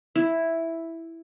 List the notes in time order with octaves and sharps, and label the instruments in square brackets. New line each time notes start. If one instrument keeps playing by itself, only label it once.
[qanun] E4